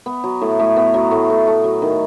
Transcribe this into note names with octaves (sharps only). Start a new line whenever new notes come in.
B3
F#3
A2
A2
B3
F#3
A2
A2
A3
F#3
D#3